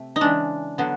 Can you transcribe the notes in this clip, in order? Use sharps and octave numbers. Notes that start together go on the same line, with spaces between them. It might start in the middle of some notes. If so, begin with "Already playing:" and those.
Already playing: C3 A3
D#4
C#3 E3 G#3 D4
D3 F#3 B3